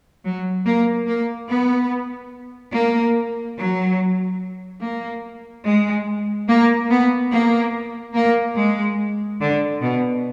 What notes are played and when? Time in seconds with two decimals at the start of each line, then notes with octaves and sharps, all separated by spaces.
0.24 F#3
0.65 A#3
1.07 A#3
1.48 B3
2.73 A#3
3.57 F#3
4.81 A#3
5.64 G#3
6.48 A#3
6.90 B3
7.31 A#3
8.15 A#3
8.57 G#3
9.40 D3
9.81 B2